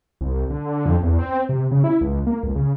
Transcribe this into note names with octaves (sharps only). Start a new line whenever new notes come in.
C2
D3
F2
E2
C4
C3
C#3
E4
C#2
A#3
C#2
C#3